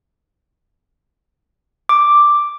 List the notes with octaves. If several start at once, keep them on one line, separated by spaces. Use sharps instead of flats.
D6